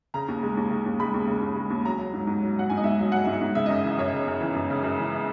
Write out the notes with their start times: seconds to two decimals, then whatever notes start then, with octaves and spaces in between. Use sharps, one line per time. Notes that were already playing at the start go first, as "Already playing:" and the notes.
0.14 C#3 A#5
0.28 D#2
0.43 G#3
0.57 D#2
0.70 C#3
0.86 D#2
1.00 G#3 B5
1.14 D#2
1.27 C#3
1.41 D#2
1.56 G#3
1.70 D#2
1.85 F#3 A#5
1.98 F#3
2.13 G#2
2.27 G#2
2.42 F#3
2.56 F#3 F#5
2.70 G#2 G#5
2.77 D#5
2.84 G#2 E5
2.99 F#3 E5
3.12 F#3 F#5
3.25 G#2 E5
3.41 G#2
3.55 C#3 E5
3.66 F#2 D#5
3.84 E3 E5
3.98 F#2 C#5
4.13 C#3
4.27 F#2
4.41 E3
4.55 F#2
4.70 C#3
4.83 F#2
4.98 E3